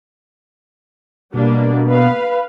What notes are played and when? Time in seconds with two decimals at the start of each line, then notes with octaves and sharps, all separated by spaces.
1.34 B2 G3 A#3 D4
1.88 B4 F5